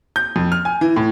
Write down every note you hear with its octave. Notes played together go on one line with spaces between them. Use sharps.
G6
F2
F6
G#5
E3
A2